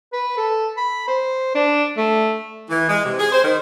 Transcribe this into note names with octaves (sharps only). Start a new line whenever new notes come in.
B4
A4
B5
C5
D4
A3
E3
G#3
C3
G#4
C5
D#3